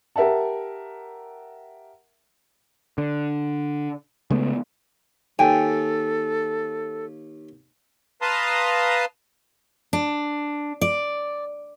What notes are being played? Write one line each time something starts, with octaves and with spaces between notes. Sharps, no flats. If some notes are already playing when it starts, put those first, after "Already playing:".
G4 A#4 E5 F#5 A5
D3
C#3 G#3 A3 B3
D#2 A4 G5 G#5
B4 F5 A5 A#5 C6 D#6
D4
D5